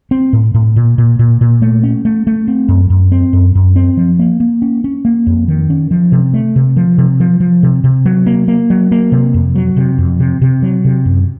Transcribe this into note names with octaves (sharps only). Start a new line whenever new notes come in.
C4
A2
A2
A#2
A#2
A#2
A#2
A3
C#4
A3
A3
C4
F#2
F#2
C4
F#2
F#2
C4
F3
A#3
A#3
C#4
C#4
A#3
F2
D#3
C#4
F3
C3
A3
C3
F3
C3
F3
F3
C3
C3
F#3
A#3
A#3
F#3
A#3
C3
F2
F#3
C3
F2
C3
C3
F#3
C3
F#2